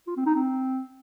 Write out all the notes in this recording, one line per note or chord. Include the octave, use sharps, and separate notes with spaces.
F4
C4
D#4
C4